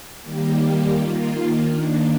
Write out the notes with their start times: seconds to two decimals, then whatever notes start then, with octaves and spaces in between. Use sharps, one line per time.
0.22 D#3 G3 A#3 G4
0.59 G4
0.94 D#3 A#3 F4
1.65 D#3 A#3 D4